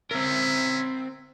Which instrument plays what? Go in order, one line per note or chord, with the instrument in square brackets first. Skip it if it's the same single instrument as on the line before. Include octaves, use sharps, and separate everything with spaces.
[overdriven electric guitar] C4 A#4 [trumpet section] C#4 E5